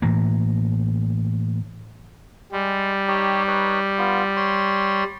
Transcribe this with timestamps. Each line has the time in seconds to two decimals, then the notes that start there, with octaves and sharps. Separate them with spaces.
0.02 A2 E3 A#3
2.52 G3 G#3
3.08 D#4 G4 C#5
3.48 D#4 B4 C#5
3.98 B3 F4
4.37 C#5 C6